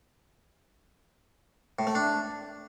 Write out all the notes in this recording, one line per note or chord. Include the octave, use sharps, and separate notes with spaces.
A2
A3
D4